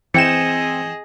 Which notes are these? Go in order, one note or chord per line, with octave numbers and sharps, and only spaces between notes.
E3 C4 G#4 D#5 G5 C#7 E7